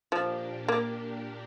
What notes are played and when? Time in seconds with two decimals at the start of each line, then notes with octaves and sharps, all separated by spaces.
0.11 A#2 F3 A#3 D4 G4
0.68 A#3